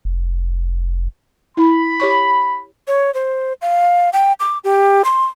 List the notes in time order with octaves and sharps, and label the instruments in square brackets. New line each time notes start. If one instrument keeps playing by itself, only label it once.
[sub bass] F1
[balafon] E4 [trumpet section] B5
[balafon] G4 C#5 C#6
[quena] C#5
C5
F5
G5
D6
G4
C6